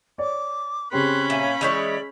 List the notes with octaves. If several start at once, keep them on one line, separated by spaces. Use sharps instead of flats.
C#5 D5 D6
C#3 C4 C#4 G4 B5 C6 F#6
A#2 C#5 E5 G#5
E3 G#3 C#5 D5 G6 B6 F7